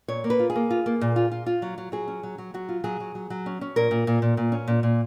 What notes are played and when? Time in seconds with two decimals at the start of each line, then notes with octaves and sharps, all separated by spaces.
0.08 A#2 C#5
0.24 A#3
0.30 B4
0.39 F4
0.50 G#4
0.56 A#3
0.71 F4
0.86 A#3
1.01 A#2
1.16 F4
1.31 F4
1.46 F4
1.62 F#3
1.78 F#3
1.92 F#3 G#4
2.08 C#4
2.23 F#3
2.38 F#3
2.54 F#3 F#4
2.69 F4
2.84 F#3 G#4
3.00 F#3
3.15 F#3
3.30 F#3
3.46 C#4
3.61 C#4
3.76 A#2 A#4
3.91 A#2
4.07 A#2
4.22 A#2
4.37 A#2
4.52 C#4
4.68 A#2
4.83 A#2